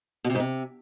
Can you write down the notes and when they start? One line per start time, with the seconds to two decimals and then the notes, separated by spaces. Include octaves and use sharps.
0.24 B2
0.30 C3
0.35 G#2
0.40 C3